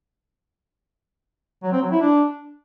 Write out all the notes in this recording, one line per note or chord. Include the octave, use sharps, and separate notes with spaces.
F#3
C4
F#3
E4
D4